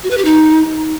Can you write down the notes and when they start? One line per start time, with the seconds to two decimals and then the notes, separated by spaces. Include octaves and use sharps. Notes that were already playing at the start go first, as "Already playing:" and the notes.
0.04 F#4
0.11 B4
0.18 G4
0.25 D#4